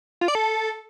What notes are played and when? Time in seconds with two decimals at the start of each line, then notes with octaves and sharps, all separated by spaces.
0.21 F4
0.28 D5
0.35 A4